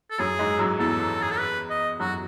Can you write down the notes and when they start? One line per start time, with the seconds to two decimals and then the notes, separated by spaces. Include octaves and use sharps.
0.10 A4
0.18 F#2 F#3 G#4
0.39 G#2 G#3
0.59 F#2 F#3
0.79 E2 E3 A4
1.22 G#4
1.31 A4
1.39 B4
1.70 D#5
1.99 F#2 F#3 F#4